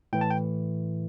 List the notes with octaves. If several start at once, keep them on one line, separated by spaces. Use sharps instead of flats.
A2 E3 G5
A5
G5